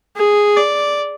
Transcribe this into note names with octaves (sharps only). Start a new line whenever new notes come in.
G#4
D5